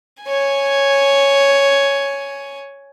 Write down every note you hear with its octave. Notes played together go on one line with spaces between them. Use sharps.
C#5 G#5